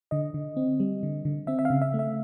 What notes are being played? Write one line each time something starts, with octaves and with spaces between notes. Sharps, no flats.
D3 D#5
D3
C4
G3
D3
D3
C4 E5
E5
F5
C#3
E5
A3
E5